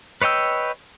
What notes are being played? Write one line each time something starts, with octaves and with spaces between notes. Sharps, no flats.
B4 C#5 D#5 G5 E6